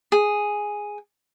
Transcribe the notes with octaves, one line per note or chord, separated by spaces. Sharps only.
G#4